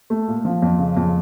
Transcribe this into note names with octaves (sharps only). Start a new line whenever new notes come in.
A3
A#2
F3
F2
C#3
F2